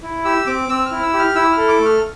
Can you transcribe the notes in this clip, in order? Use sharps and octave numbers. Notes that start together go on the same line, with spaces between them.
E4
G4 E6
C4 D6
C4 E6
F6
E4
E6
G4
F6
E4 E6
F6
A4
D6
A3 F6